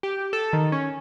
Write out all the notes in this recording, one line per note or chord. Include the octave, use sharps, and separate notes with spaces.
G4
A4
D#3
C#4